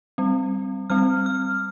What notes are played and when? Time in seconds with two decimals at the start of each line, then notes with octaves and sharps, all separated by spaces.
0.18 G3 C4
0.90 G3 C4 F6
1.26 F6